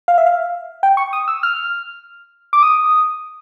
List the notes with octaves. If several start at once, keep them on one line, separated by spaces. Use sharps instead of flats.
F5
E5
F5
G5
C#6
D#6
E6
F6
D6
D#6